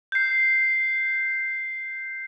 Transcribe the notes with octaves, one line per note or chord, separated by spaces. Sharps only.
G6 C7